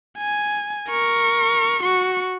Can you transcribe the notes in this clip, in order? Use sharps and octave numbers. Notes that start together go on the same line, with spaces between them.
G#5
A#4 C#6
F#4 C#6